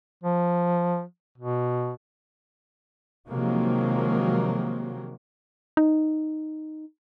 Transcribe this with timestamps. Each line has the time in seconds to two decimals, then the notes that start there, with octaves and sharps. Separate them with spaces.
0.24 F3
1.38 B2
3.29 C3 D#3 F3 F#3 G#3 A#3
5.77 D#4